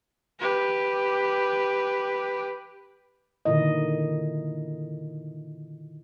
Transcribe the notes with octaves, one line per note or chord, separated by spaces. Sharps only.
G4 B4
A#2 D3 D#3 E4 D#5